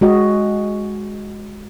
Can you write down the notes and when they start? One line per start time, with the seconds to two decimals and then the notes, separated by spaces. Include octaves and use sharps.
0.01 G#3 F#4 D#5